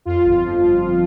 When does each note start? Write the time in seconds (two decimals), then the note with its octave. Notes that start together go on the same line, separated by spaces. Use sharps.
0.05 F2 F4
0.24 G1
0.44 F3